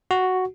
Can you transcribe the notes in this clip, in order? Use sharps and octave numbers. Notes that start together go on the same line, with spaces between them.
F#4